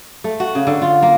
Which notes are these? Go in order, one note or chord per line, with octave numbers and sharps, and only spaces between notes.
A3
F#4
C#3
D3
F4
A#3